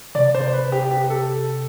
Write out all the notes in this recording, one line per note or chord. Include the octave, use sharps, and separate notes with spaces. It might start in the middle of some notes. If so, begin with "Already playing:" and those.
C3 D5
C5
B4
G4
G4
A4